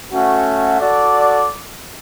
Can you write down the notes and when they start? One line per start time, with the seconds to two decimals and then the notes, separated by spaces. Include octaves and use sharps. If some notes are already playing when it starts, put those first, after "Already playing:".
0.12 A3 C#4 F#4
0.80 F#4 A4 D5